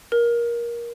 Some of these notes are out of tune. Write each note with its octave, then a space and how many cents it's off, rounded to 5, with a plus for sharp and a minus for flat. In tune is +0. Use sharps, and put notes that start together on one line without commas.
A#4 +20